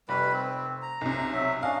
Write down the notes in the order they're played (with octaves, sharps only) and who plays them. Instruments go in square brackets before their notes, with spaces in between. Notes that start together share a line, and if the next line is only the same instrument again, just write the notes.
[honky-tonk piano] F1 [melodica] G3 B4 B5
[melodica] C4
A#5
[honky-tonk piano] B1 C3
[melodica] F#3 E5
[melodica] C#4 D4 D#5 [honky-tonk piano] F5